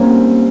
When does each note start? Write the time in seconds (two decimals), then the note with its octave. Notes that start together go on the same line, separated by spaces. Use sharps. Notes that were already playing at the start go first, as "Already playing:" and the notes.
Already playing: G3 A#3 C4 C#4 D#4